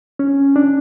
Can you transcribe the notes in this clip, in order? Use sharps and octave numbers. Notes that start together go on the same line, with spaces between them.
C#4
D4